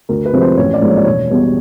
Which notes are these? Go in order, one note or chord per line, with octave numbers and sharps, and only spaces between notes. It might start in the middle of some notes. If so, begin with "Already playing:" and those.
D2 A#4
B4
C3 F3 G#3 C4
C5
A1 C#5
D5
G#2 F3 A#3
C#5
D5
E1 C#5
E2 B2 G3